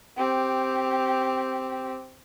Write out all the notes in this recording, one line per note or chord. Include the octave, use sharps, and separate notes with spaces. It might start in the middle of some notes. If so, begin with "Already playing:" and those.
C4 G4